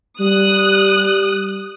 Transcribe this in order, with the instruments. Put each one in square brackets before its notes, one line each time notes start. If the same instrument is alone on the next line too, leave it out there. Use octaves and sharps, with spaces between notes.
[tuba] G3 [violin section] D#6 F#6